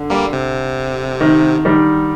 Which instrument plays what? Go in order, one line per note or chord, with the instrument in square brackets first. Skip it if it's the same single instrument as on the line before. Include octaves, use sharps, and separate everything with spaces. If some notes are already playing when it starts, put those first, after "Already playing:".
Already playing: [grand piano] D3
[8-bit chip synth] G3 A#3
C3
[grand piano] D#3
D#3 G3